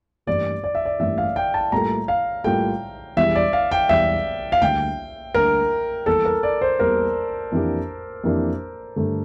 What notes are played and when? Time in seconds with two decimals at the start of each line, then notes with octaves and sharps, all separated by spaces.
0.27 A1 G2 E3 A#3 D5
0.64 D5
0.75 E5
0.85 D5
0.99 A1 G2 E3 A#3 E5
1.18 F5
1.36 G5
1.54 A5
1.72 A2 G3 A#3 F4 A4 A#5
2.08 F5
2.44 A2 G3 A#3 F4 A4 G5
3.17 E1 E2 E3 G3 E5
3.35 D5
3.53 F5
3.71 G5
3.89 E1 E2 E3 G3 E5
4.52 F5
4.61 D2 D3 G3 A#3 D4 G5
5.34 D2 D3 G3 A#3 D4 A#4
6.06 E2 E3 G3 A#3 E4 A4
6.25 A#4
6.43 D5
6.61 C5
6.79 E2 E3 G3 A#3 E4 A#4
7.52 F2 E3 A#3 D4 G4
8.24 F2 E3 A#3 D4 G4
8.96 G2 D3 A3